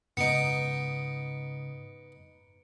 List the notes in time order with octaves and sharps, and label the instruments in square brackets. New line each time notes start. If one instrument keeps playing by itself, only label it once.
[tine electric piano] G#2 C#3 [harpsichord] B3 D#4 [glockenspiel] C#7 D7